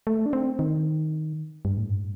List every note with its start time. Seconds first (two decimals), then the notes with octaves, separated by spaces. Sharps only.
0.07 A3
0.26 D4
0.33 C4
0.59 D#3
1.65 G2
1.77 A2
1.90 G2